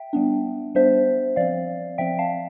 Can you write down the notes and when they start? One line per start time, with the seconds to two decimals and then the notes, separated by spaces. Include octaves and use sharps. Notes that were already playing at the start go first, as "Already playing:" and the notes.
Already playing: E5 G5
0.13 G3 B3 D4
0.75 G3 B3 D4 C5 E5
1.36 F3 C4 D5 F5
1.98 F3 C4 E5 G5
2.19 F5 A5